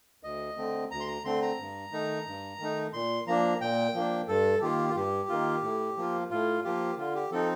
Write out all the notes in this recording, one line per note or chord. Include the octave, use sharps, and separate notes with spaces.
D2 D#5
D3 A3 C4
D2 A#5
C6
A#5
D3 A3 C4 C6
A#5
G2
D#3 A3 D#4
G2
D#3 A3 D#4
A#2 C6
F3 A#3 D4 A#5
A#2 G5
F3 A#3 D4
G2 A4
D#3 A#3 F4 G4
F4
G2 G4
D#3 A#3 F4
A2
F3 A#3 F4
A2 F4
F3 A#3 F4 G4
D3 F4
G4
F3 C4 D#4 A4